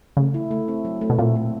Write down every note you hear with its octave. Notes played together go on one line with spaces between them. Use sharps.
C#3 A3
E4
A3
C4
F#3
A3
B2
A#2 C4
A3